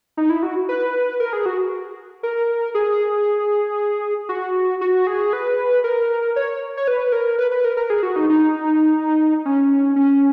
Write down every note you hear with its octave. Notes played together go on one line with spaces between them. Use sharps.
D#4
E4
F#4
B4
A#4
G#4
F#4
A#4
G#4
F#4
F#4
G#4
B4
A#4
C#5
C#5
B4
A#4
B4
B4
A#4
A#4
G#4
F#4
D#4
D#4
C#4
C#4